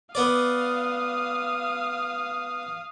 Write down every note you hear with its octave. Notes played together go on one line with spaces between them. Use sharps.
B3 D5 F5 D#6